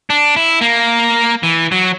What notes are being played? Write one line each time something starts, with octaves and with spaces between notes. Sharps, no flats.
D4
E4
A#3
E3
F#3